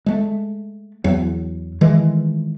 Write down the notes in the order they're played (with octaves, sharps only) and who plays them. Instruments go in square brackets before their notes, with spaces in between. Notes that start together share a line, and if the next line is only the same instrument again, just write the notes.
[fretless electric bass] G#3 A3
E2 F#3
D#3 E3 G#3 A3